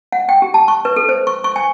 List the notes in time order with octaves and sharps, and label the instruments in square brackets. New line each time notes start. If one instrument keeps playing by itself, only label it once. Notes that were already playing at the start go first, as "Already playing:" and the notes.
[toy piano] F#5
G5
G4
A5
C#6
B4
A4
C5
C#6
C#6
G#5